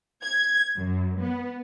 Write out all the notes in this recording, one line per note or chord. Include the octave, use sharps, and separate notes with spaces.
G#6
F#2
B3